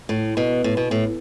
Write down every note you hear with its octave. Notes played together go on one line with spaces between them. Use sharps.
A2
B2
A2
B2
A2